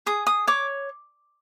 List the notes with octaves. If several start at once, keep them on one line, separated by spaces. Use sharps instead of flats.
G#4 D#6
D#6
C#5 D6